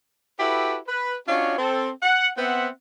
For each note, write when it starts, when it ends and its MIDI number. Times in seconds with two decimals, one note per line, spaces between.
0.39 0.77 64
0.39 0.77 66
0.39 0.77 67
0.39 0.77 69
0.39 0.77 71
0.87 1.16 71
1.27 1.55 61
1.27 1.55 62
1.27 1.55 65
1.27 1.55 66
1.27 1.55 73
1.27 1.55 75
1.58 1.89 60
1.58 1.89 69
2.03 2.29 78
2.37 2.69 59
2.37 2.69 60
2.37 2.69 72
2.37 2.69 76
2.37 2.69 78